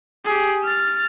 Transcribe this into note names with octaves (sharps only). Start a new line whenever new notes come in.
G4 G#4
F6 A6